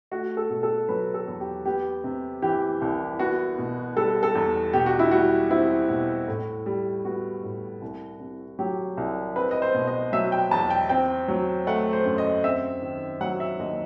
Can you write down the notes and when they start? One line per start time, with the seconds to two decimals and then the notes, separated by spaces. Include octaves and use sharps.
0.11 A3 F#4
0.37 A4
0.50 B2
0.63 A4
0.89 F#3 B4
1.14 A4
1.28 E2
1.40 G4
1.65 B3 G4
2.04 C3
2.42 E3 G4
2.82 C2
3.19 B3 F#4
3.58 B2
3.96 G3 A4
4.23 A4
4.35 E2
4.73 B2 G4
4.86 F#4
4.99 E4
5.11 G3 F#4
5.51 C4 E4
5.89 B2
6.28 A2
6.66 G3
7.05 B3 F#4
7.43 A2
7.82 C2
8.20 C3
8.59 F#3 G4
8.97 C2
9.36 C4 B4
9.51 D#5
9.62 C5
9.74 B2
9.87 D#5
10.13 F#3 E5
10.32 G5
10.51 E2 A5
10.70 G5
10.89 C4 G5
11.28 F#3
11.67 A3 F#5
11.93 C5
12.05 F#2
12.18 D#5
12.44 C4 E5
12.82 D#3
13.21 F#3 F#5
13.40 E5
13.59 D#2 D#5